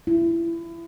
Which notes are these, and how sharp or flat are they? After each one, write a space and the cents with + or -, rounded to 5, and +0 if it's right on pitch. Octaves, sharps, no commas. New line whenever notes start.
E4 +25